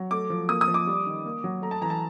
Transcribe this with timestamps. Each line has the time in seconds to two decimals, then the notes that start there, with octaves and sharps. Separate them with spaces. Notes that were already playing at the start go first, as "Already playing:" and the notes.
Already playing: F#3
0.11 A3 D6
0.30 F3
0.49 A#3 D#6
0.61 D#6
0.68 F3
0.74 D6
0.87 G3
1.06 D#3
1.25 A#3
1.44 F#3
1.62 A3 A#5
1.71 A5
1.81 E3 A#5
1.90 A5